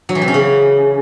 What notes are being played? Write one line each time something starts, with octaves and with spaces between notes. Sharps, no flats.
F#3
E3
C3
C#4
C#3